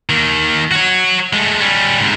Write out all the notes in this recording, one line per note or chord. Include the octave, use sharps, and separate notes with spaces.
D#3 A#3
F#4 C#5
G#3 A3
G3 C#4
G#2 C3